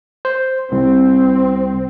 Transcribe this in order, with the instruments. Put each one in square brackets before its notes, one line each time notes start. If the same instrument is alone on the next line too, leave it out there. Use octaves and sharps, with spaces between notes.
[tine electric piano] C5
[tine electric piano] C2 [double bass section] C4